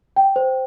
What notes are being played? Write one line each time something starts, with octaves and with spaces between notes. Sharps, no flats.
G5
C5